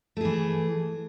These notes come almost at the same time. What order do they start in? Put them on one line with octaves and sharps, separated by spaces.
A3 G#4 E3